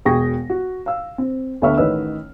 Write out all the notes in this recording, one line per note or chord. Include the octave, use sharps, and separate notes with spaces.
E1 B2 G#4 G5 C#6 A#6
F#4
F5 E6
C4
D2 D3 B3 E5 C#6 F6
A1 D#3 B4 C#5 D#5 E6